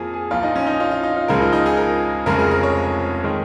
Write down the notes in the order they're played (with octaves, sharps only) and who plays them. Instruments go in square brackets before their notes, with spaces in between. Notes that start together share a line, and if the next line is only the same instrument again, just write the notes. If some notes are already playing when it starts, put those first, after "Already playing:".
Already playing: [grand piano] F2 F3 A#3 G#4
G#4
A#1 A#2 F3 F4
D#4
C#4
D#4
F4
F4
D#4
F4
C#2 C#3 F3 G#3 A#4
D#4
D#4
G#4
A#4
F1 F2 C#3 F3 G#3 A#4
G#4
A#4
C#5
D#3 G#3